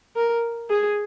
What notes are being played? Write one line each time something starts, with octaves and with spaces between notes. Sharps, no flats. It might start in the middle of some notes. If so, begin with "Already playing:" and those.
A#4
G#4